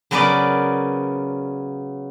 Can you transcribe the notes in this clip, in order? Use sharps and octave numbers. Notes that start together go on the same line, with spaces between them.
C#3 F#3 B3 A#4 B4 D5